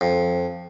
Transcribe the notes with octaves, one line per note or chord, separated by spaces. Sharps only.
F2